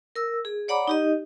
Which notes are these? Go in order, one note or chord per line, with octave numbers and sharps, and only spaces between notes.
A#4 E6
G#4
C#5 D5 F#5 A#5 B5 D6
D#4 G4 D#5